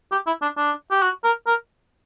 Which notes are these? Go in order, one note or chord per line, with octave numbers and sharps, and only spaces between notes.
G4
E4
D4
D4
G4
F#4
A#4
A#4